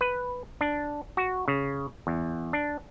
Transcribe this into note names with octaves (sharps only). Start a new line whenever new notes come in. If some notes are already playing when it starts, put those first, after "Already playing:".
B4
D4
F#4
C#3
E2
D4